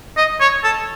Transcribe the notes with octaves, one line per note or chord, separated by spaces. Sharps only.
D#5
C#5
A4